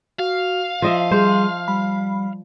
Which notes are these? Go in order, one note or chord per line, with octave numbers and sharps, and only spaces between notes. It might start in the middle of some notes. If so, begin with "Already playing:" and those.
F#4 F5
F3 D#5 E5 C6
G3 G#4 C5
G3 B5